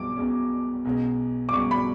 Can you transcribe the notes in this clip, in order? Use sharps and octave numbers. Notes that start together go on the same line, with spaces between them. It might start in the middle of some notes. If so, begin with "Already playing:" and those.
Already playing: B1 B2 G#3 D6
B1 B2 G#3 C#4
B1 B2 G#3 C#4
D6
B1 B2 G#3 C#4 C#6
B5